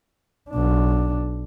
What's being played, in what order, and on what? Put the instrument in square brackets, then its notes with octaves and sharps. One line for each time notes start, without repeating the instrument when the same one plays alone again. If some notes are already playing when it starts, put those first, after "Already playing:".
[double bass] B1 D4